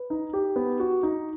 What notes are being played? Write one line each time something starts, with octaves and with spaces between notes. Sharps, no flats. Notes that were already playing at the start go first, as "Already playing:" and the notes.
Already playing: B4
D#4
G4
B3
F#4
D#4